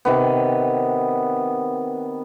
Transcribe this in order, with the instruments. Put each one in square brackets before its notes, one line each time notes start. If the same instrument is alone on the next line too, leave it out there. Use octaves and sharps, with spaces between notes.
[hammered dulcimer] C3 D#3 B3